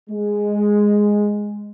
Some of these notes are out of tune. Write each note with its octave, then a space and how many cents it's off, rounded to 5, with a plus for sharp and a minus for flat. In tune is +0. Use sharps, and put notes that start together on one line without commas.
G#3 -5